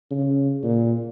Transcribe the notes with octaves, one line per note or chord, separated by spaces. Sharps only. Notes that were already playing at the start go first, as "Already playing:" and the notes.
C#3
A#2